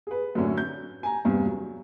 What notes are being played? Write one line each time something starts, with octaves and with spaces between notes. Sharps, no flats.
G#4 B4
F#2 A2 D3 F#3 C#4
G6
G#5 A#5
E2 G2 C3
F#3